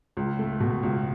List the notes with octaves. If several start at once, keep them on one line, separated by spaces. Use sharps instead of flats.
C#2
A3
B2
C#2